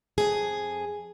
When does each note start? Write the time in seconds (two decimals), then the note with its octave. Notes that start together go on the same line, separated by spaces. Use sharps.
0.18 F2 G#4